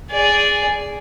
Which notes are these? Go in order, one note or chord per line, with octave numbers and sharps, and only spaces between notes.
G#4 D5